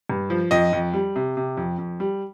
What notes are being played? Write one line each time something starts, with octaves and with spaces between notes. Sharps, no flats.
G2
F3
F2 D#5
F2
G3
C3
C3
F2
F2
G3